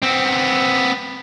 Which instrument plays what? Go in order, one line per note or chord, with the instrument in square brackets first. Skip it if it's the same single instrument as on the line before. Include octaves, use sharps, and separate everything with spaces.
[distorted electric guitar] B3 C4